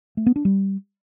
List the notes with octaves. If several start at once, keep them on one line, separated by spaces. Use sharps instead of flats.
A3
B3
D4
G3